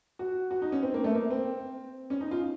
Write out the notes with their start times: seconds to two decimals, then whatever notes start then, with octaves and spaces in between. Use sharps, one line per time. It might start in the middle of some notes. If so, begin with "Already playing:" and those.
0.19 F#4
0.51 F#4
0.62 D#4
0.72 C#4
0.83 C4
0.94 A#3
1.04 A3
1.14 A#3
1.31 C4
2.10 C#4
2.21 D#4
2.31 F4